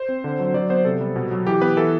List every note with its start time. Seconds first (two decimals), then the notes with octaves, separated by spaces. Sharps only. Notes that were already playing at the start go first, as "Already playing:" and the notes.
Already playing: C5
0.09 C4
0.24 D3
0.40 F#3
0.54 F#3 D5
0.69 B3 C5
0.85 C3 A4
1.01 G3
1.16 B2
1.31 F#3
1.46 E3 G4
1.61 B3 B4
1.77 E3 A4